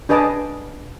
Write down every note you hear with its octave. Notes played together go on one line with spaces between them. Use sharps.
D4 G#4 B4 D#5 A5 D6